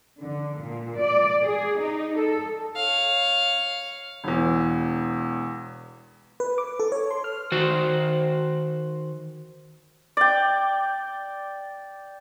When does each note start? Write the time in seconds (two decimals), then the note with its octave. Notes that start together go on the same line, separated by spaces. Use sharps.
0.21 D3
0.59 A#2
0.99 D5
1.43 G#4
1.80 D#4
2.18 A4
2.76 C#5 F5
4.24 E1 E2
6.40 B4
6.58 D6
6.80 A4
6.92 C#5
7.11 C6
7.24 F6
7.52 D#3 F#4 C5
10.17 D5 G5